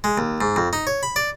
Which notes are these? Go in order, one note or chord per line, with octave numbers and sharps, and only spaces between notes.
G#3
D#2
G#2
F2
D#4
C#5
B5
D5